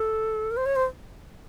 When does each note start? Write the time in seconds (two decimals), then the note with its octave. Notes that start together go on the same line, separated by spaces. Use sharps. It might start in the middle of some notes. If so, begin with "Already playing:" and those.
Already playing: A4
0.51 A#4
0.57 C5
0.66 C#5
0.76 C5